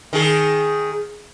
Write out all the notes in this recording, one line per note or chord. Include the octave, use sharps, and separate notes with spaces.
D#3 G#4